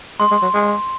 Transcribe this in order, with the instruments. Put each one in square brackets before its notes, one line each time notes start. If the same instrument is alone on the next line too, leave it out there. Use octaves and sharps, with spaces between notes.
[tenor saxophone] G#3 [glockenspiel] C6
[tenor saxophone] G#3
F#3
G#3